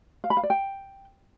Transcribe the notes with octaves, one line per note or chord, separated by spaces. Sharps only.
F5
B5
F5
D5
G5